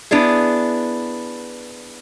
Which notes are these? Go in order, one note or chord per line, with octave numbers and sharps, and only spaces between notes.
B3 D4 E4 G#4